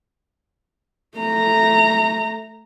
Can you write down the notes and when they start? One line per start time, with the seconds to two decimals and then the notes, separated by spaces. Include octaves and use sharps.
1.18 A3 A#5